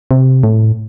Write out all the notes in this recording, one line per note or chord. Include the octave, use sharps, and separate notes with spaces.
C3
A2